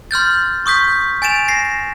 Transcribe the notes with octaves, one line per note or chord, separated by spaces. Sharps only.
C6 F6 G6 A6
C#6 D#6 G6 B6
G#5 A6 D7 E7 F7
A#6 C7